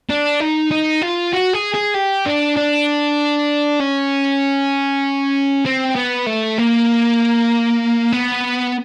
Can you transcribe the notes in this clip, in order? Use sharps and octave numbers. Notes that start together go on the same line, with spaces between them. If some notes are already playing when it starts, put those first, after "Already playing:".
D4
D#4
D#4
F4
F#4
G#4
G#4
G4
D4
D4
C#4
C4
B3
A3
A#3
B3